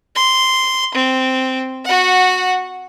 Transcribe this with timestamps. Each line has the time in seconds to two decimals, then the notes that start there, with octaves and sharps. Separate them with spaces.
0.15 C6
0.94 C4
1.85 F#4 F#5